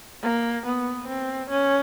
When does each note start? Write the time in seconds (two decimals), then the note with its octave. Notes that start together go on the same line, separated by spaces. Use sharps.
0.22 A#3
0.66 B3
1.08 C4
1.51 C#4